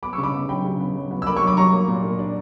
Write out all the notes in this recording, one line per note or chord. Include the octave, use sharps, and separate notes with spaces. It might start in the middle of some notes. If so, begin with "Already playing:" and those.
B3 B5 D6
C#6 E6
C#3
B5 D6
B3
F#3 G5 B5
C#3
B3
F#3
B3
E6
A#3 B5 D6
C#6 E6
F#3
B5 D6
F#3 A#5 C#6
A#3
A#2
A#3
D4